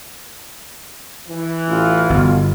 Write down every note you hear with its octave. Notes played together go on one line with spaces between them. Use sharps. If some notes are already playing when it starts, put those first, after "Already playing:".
E3
A1 F4
G1 B2